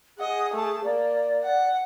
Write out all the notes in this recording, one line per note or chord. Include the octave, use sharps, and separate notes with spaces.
G#4 D#5 F#5
A3 A5
A#3 D5
F#5